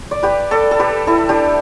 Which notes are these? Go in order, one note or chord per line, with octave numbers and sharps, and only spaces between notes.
D5
G4 B4
A4 D5
A4
G4 B4
E4 A4
D4 G4